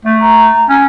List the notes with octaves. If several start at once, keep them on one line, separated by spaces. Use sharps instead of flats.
A3
A#5
C#4